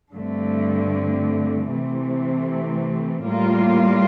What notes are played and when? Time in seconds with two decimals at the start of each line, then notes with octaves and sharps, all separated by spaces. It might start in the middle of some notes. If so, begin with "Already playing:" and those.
0.14 G2 D3 A3 C4
1.71 C3 E3 A3 C4
3.27 A2 G3 A#3 F4